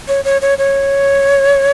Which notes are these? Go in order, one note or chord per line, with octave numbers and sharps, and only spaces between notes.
C#5
C#5
C#5
C#5